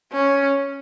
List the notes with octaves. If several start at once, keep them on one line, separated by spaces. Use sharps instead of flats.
C#4